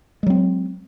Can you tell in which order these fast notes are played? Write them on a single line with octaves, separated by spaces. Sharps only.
G#3 F#3 C4